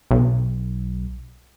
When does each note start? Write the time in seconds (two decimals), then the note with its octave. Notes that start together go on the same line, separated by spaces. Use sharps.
0.11 B1